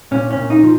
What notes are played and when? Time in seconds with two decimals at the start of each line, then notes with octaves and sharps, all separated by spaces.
0.11 A#2 C#4
0.31 C#4
0.37 A#2
0.50 D#4
0.63 F3